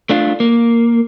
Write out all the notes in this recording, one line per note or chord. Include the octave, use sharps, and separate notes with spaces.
A3 D4 F4
A#3